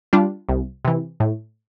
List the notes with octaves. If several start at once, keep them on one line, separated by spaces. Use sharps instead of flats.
G3 D4 F4
C2
C3 E3
A2